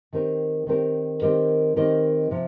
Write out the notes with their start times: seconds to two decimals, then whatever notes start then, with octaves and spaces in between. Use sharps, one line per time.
0.13 D#3 C4 G4 A#4
0.67 D#3 C4 G4 A#4
1.22 D#3 C4 G4 A#4 D#5
1.76 D#3 C4 G4 A#4 D#5
2.31 C3 F3